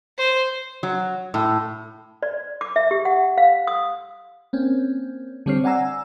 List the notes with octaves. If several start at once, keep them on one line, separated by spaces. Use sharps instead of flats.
C5
F#3
A2
D5
D6
E5
G4
F#5
F5
D#6
A#3 C4 C#4
D3 G3 C4 C#5 F6 C7
D5 F#5 G#5 A#5 E6